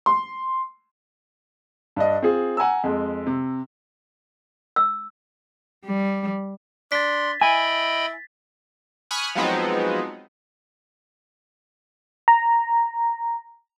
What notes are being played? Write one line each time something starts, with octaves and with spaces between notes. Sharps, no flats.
C6
G2 D4 D#5
C4 F4 G#4
F#5 G#5 A#5 E6
F2 G#3
C3
E6
G3
D4 C6 A6 B6
E4 D#5 G5 G#5 B5
G#5 B5 C#6 D#6 F6 F#6
F3 F#3 G#3 B3 C4 D#4
A#5